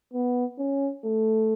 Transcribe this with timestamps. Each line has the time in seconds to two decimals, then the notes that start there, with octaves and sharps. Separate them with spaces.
0.13 B3
0.58 C#4
1.05 A3